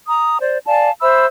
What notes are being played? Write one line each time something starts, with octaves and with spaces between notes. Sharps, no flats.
A#5 D#6
C5 D5
D5 F5 G#5 A5
C5 E5 B5 E6